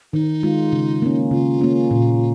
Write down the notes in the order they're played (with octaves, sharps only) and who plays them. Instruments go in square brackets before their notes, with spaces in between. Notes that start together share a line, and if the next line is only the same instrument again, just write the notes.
[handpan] D#3 [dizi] D#4
[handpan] G#3 F4
C#3
A#3 C#4
[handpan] C#3 [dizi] F4
[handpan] A#3 C#4
A#2